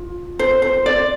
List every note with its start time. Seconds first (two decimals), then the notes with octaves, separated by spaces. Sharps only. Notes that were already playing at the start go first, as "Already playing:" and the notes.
Already playing: F4
0.39 C5
0.62 C5
0.86 D5